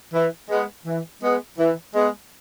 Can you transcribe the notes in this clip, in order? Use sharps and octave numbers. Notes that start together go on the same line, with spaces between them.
E3
G#3 B3
E3
G#3 B3
E3
G#3 B3